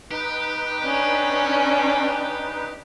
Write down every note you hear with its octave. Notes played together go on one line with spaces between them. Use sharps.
D#4 G4 B4
C#4 D4